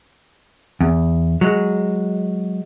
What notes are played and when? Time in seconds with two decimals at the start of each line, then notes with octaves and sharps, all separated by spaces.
0.81 E2
1.41 F#3 G#3